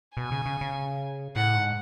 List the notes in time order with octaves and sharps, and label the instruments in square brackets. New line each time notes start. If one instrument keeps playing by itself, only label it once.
[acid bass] B2 [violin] G#5
[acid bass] C#3
C#3
C#3
[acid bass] A2 [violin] F#5
[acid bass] G#2